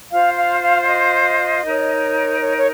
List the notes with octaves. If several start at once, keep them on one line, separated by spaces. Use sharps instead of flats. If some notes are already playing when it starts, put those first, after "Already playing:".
F4 C5 F5
F5
F5
F5
D#5
D#4 A#4 C#5
C#5
C#5